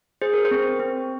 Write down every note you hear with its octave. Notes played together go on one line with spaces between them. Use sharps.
G#4 C5
A#4
C5
C4
C4